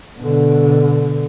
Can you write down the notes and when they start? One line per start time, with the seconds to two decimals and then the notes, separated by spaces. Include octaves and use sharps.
0.17 B2 D3